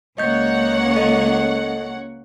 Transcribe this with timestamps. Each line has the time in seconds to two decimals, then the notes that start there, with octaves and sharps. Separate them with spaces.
0.18 C#2 A#3 C#5 D#5 F#5 G6
0.96 A4 D#5